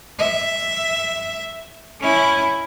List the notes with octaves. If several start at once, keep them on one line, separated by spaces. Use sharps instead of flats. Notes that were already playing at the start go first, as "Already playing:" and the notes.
E5
C#4 E4